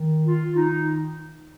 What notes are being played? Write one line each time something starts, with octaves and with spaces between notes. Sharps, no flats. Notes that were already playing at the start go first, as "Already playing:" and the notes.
Already playing: D#3
F4
D#3
D#4